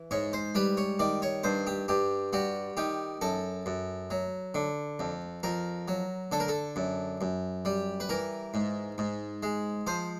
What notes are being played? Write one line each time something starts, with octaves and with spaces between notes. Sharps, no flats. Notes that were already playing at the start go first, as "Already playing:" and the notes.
Already playing: E3
G#2 C#5
C5
G3 B4
C#5
D#3 D5
C#5
G2 C5
G4
G2 G4
G3 F#4
D#3 G4
F#2 A4
F#2
F#3
D3
F2
F2 A#4
F#3
D3 A4
A#4
A4
F#2
F#2
G3
B4
E3 A#4
G#2
G#2
G#3
F3 C5